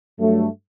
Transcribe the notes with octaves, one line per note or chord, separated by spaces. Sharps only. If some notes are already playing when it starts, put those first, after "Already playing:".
G2 F#3 A3